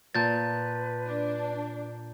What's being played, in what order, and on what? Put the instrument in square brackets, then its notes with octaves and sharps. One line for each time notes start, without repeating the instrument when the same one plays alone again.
[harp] A#2 [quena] B4 [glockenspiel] A5 G6 A6
[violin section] D4